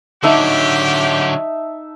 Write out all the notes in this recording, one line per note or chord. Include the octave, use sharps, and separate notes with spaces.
D3 F#3 D#4 G4 E5 A5